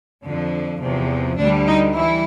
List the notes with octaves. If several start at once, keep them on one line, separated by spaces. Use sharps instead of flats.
F2 D3 F3
E2 C3 F3
D2 D3 G3 D4
D#4
E3 G3 E4